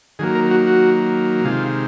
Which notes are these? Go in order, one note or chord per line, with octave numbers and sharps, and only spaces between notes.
D#3 F#3 A#3 G#4
A#4
F#4
F#4
C3 D#3 G#3 F4